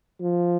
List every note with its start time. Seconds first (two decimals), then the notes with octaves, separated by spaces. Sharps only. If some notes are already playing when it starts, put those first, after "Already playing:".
0.22 F3